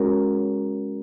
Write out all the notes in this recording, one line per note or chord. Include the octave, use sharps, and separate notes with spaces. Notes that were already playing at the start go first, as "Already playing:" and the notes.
Already playing: G#3 C#4 F#4 A#4